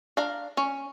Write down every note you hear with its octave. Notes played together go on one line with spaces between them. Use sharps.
D4 F5 A#5
C#4